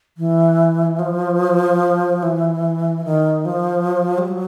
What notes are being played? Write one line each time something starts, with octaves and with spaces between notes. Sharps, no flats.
E3
F3
E3
D#3
F3
G3
F#3